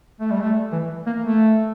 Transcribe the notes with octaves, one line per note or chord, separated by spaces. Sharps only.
A3
G3
A3
E3
A#3
A3